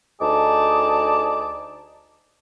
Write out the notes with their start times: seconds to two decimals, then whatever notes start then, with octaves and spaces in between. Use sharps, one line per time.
0.21 D2 D#4 G#4 D5 A5 D6